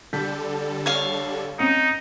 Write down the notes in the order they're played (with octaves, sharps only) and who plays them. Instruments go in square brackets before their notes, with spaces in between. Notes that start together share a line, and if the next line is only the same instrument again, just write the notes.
[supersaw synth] D3 G3 A4 [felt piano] A5 G6 B6
[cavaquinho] C#5 F5
[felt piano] C4 C#4 C#7 [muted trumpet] D#4